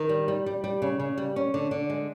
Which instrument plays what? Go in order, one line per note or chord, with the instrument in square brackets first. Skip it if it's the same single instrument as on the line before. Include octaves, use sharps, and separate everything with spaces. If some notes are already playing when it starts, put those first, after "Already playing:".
Already playing: [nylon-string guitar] D#3
G3
G3
G3
G3
C#3
C#3
G3
C#4
D3
D3
G#3